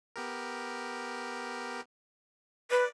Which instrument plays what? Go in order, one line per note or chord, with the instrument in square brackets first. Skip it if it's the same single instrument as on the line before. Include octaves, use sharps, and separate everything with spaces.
[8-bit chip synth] B3 G4 A#4
[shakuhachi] B4 [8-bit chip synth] D5